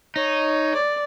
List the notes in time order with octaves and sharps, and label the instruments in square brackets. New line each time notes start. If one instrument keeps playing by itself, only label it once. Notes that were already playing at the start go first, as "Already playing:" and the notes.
[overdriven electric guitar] D#4 [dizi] C#5
[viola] D5